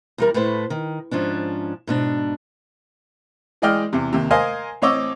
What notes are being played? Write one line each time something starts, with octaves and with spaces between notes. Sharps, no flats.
E2 G3 A#4
A2 A3 B4 C5
D#3
G#2 F3 C#4 D4
G#2 B2 D4
E3 G#3 D5 D#5 G5 F6
E2 C3
D#2 C3
A#4 C5 D#5 F5 G#5
A1 C4 C#5 D#5 D6 E6